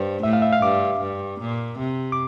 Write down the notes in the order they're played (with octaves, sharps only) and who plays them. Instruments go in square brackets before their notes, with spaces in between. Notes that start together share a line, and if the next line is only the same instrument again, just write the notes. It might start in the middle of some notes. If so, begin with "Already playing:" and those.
Already playing: [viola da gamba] G2 [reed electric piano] C5
[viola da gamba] A2 [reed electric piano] E5
[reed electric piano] F5
E5
F5
[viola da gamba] G2 [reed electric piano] D6
[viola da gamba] G2
A#2
C3
[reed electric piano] D6